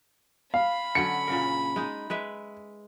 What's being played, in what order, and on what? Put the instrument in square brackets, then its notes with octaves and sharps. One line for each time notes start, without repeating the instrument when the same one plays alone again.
[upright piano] F5 [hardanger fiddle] B5
[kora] D3 F#3 C#4 [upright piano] C#7
[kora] A#2 C#3 A#4
G#3 D#4
G#3 B4 E5